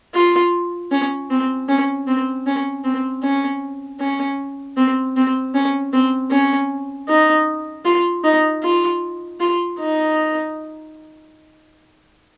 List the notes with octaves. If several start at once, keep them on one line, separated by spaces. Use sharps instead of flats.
F4
C#4
C4
C#4
C4
C#4
C4
C#4
C#4
C4
C4
C#4
C4
C#4
D#4
F4
D#4
F4
F4
D#4